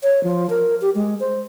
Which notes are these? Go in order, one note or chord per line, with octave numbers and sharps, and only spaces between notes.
C#5
F3
A#4
G4
G#3
C5